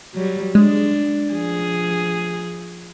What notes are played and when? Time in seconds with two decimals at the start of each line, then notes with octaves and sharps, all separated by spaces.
0.15 F#3 G3
0.55 G#3 D4
1.31 F3 G#4